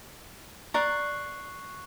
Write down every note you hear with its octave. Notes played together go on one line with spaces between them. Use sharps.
D5 A#5 C#6 F#6 C7